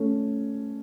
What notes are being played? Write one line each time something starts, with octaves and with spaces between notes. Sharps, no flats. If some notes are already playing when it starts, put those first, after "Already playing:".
Already playing: A3 C#4